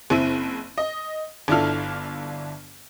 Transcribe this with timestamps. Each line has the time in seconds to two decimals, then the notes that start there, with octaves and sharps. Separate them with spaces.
0.10 F#1 C4 E4 D#7
0.78 D#5
1.48 G1 D4 E4 F4 A4 F6